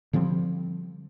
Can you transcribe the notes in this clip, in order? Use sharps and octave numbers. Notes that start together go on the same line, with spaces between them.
D3 F3 G3 C4